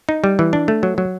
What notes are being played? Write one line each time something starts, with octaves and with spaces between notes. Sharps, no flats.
D#4
G3
E3
D4
A3
F#3
F#3